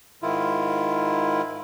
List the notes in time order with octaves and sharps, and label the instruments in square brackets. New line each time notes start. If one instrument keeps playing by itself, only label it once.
[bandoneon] G#2 D#3 E4 F4